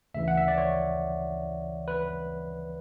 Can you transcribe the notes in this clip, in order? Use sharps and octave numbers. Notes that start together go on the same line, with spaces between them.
D2 C#3 E3 E5
F#5
E5
D5
C#5
B4